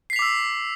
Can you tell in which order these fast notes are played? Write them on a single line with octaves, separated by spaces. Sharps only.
C7 B6 F7 D6 E6